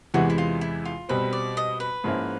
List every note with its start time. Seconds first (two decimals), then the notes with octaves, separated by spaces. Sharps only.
0.14 E2 C3 E3 G#3 F#4
0.30 E4
0.38 F4
0.61 E4
0.85 F4
1.09 B2 G3 C4 B4
1.33 D5
1.57 D#5
1.80 B4
2.04 G#2 F3 A#3 C#4 E4